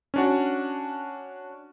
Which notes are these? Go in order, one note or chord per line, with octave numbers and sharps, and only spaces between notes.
C#4 D4 F#4